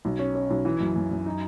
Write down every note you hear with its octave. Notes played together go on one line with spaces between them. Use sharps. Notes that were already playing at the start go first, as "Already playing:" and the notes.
B1
C#4
C#4
B1
E3
F#2
F#2
F#2
D#4